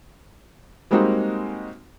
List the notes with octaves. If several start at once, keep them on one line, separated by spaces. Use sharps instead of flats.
G3 G#3 A#3 C4 D#4 F#4